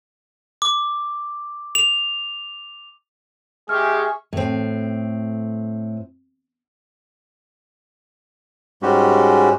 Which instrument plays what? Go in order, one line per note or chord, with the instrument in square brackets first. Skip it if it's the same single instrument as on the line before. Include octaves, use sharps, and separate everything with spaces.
[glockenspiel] D6
F7
[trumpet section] G#3 G4 [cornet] G#4 [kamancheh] E5 C#6 [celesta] F6
[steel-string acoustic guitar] A2 C4
[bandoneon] G#2 G3 G#3 C#4 F#4 G4